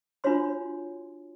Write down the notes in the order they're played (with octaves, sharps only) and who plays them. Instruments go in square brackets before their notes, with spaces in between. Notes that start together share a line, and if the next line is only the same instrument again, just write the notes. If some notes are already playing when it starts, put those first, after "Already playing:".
[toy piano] D4 F4 F#4 C#5 C6